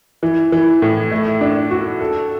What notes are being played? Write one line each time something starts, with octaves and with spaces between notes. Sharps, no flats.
E3
E3
A2
A3
D4
F#4
A4